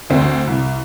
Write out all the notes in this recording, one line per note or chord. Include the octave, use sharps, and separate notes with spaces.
D2 C4
C2